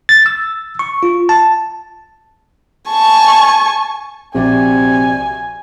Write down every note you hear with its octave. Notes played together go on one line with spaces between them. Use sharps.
A6
E6
C#6
F4
A5
G#5 A5 C#6
A#1 C3 F#4 D5 G#5